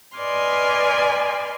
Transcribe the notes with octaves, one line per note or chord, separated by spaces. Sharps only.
B4 D5 D#5 G#5 C6 F6